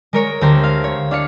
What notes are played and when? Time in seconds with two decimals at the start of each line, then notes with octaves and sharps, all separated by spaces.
0.13 G#3 A#4 C#5
0.41 D2 G4 A#4 C5 C6
0.63 F5
0.84 C#5
1.11 D4 F5 C#7